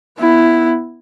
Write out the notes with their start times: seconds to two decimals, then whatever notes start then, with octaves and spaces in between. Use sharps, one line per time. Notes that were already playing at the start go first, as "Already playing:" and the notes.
0.19 B3 E4